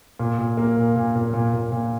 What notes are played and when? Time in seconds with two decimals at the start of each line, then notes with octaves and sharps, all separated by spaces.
0.19 A#2
0.39 A#2
0.57 A#3
0.77 A#2
0.96 A#2
1.16 A#2
1.34 A#2
1.53 A#2
1.72 A#2